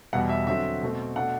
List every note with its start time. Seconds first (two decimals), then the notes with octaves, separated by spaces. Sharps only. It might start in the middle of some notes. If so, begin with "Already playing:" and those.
0.13 E2 B2 G3 F#5
0.29 E5
0.47 D3 F#3 C4 E5
0.81 B2 A3 C4
1.16 B2 A3 D4 F#5